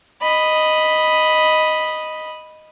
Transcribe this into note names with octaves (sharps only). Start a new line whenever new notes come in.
D#5 B5